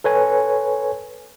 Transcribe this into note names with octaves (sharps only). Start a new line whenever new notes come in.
A4 B4 C#5 G#5